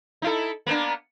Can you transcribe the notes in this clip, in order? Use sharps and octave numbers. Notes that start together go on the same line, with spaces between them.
D#4 E4 A4
A#3 B3 D4